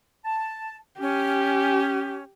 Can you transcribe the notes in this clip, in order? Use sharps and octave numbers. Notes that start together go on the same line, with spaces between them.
A5
C#4 G4